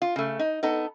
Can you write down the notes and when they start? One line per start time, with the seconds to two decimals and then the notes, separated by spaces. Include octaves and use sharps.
0.02 F4
0.16 C#3 A3
0.39 D#4
0.63 B3 D#4 A4